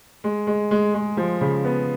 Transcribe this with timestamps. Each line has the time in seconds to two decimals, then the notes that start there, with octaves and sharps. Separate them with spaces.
0.24 G#3
0.47 G#3
0.71 G#3
0.94 G#3
1.17 F3
1.41 C#3
1.65 B3